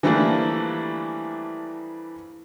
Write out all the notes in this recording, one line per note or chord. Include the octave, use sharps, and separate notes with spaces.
E3 F3 G3 A3 A#3 D4